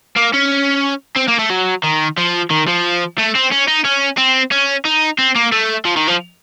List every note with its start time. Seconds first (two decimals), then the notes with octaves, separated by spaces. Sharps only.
0.16 A#3
0.34 C#4
1.16 C4
1.28 A#3
1.39 A3
1.50 F#3
1.83 D#3
2.17 F3
2.50 D#3
2.67 F3
3.18 A3
3.35 C4
3.51 C#4
3.68 D#4
3.85 C#4
4.18 C4
4.51 C#4
4.85 D#4
5.18 C4
5.36 A#3
5.52 A3
5.85 F3
5.97 D#3
6.08 F3